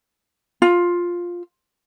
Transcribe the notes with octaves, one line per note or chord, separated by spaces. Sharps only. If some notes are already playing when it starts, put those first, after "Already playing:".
F4